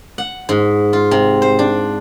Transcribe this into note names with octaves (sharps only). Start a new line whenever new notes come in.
F#5
G#2
F4
C3
C5
D4